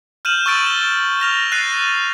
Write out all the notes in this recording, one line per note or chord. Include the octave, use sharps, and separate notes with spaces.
F6 G6 D#7 E7 F#7
C#6 E6 A6 D7 E7
G7
F6 A#6 F7
F#6 A6 A#6 C7 D#7